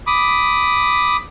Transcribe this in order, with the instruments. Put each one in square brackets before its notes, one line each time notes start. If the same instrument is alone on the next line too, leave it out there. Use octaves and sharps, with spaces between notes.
[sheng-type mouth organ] B5 D6 D#6